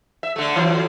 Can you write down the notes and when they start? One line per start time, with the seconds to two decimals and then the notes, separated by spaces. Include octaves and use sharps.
0.23 E5
0.36 D3 A3
0.56 E3 F#3